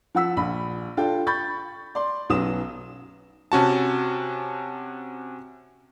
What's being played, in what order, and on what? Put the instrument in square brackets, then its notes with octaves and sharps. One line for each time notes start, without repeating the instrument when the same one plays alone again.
[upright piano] F3 F#5 E6 B6
A#1 B5
D4 F4 A4 G5
B5 C#6 G6 A6
D5 C6
B1 F#3 B3 C#4 D#6 E7
[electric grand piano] C3 C#4 F#4 A5